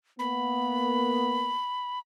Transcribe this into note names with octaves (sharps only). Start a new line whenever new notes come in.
A#3 B3 B5